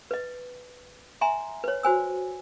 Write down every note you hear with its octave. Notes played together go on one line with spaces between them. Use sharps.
B4 D#5
E5 G#5 A#5 C6
B4 C#5
F#4 C5 G#5 E6